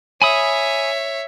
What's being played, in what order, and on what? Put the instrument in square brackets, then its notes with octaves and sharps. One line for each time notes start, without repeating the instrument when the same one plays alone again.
[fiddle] C#5 E5 [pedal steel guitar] G#5 B5 D#6